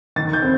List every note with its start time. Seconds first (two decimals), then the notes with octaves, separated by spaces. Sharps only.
0.16 D#3 A6
0.33 G6
0.42 C4